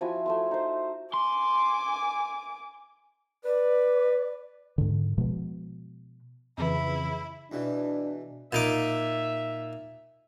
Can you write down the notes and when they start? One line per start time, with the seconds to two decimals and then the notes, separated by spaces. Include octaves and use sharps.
0.01 F3 E4 F#4 G#5
0.26 A3 E5 C6
0.51 D#4 C5
1.14 G#5 C6 D6
3.45 B4 D5
4.78 G#2 D3
5.18 B2 F3 G#3 B3
6.58 F2 C#3 E3 E4
7.52 E2 B2 E3 D4
8.53 A#2 D#4 E5 D6